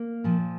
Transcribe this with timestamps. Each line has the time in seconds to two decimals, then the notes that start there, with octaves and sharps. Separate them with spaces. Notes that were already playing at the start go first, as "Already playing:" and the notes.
Already playing: A#3
0.24 A#2 F3